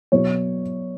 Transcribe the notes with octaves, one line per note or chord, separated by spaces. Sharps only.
B2 F#3 C#5